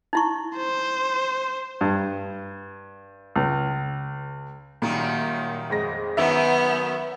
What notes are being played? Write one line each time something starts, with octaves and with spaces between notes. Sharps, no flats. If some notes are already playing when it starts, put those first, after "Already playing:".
D#4 E4 C#6
C5
G2
C#2
F#2 A#2 D#3 G3
F2 G#3 A#6
F#2 D#3 F#3 B3 E5